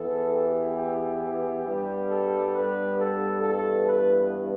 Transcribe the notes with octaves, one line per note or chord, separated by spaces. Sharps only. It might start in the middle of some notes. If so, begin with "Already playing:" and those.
Already playing: E2 E3 B3 A4
G4
G4
G2 G3 B3
A4
B4
A4
G2 E3 B3 A4
B4